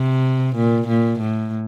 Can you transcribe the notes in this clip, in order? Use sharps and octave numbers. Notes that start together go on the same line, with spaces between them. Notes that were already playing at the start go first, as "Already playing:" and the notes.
Already playing: C3
A#2
A#2
A2